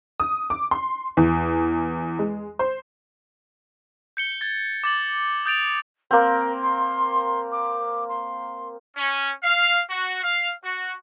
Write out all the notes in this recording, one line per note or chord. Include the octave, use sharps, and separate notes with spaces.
D#6
D6
C6
E2
G#3
C5
G6 C#7 G7
G#6 A6
D6 A6 F#7
D#6 G6 A6 D7 F7
A#3 C4 A#4
C6
D6
C6
C#4
F5
F#4
F5
F#4